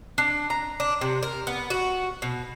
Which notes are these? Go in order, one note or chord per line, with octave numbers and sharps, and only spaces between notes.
D4
A#5
D4
C3
A#4
B3
F#4
B2